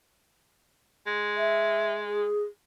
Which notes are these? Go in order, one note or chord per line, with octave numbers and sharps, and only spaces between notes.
G#3
E5
G#4